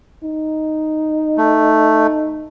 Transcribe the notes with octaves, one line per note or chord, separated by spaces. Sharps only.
D#4
A3